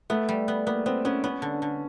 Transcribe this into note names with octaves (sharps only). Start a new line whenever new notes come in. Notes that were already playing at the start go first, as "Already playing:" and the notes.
A3 B3
G3
B3
A#3 B3
B3 C4
B3 C#4
B3 C#4
D3
D3